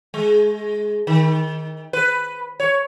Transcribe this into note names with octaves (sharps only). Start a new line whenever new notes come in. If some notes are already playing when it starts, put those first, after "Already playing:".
G#3
D#3
B4
C#5